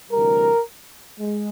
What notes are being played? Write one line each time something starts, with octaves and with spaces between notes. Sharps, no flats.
D2 C3 E3 G3 A#4
G#3